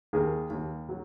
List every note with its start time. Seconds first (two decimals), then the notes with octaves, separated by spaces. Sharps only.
0.13 D#2 G#4 A#4
0.50 D#2
0.89 F#3